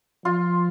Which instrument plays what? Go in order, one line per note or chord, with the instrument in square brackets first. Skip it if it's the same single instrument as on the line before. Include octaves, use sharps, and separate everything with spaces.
[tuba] F3 [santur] F4